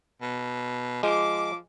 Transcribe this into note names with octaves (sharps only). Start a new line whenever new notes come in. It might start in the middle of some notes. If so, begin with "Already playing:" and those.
B2
F3 G#3 D6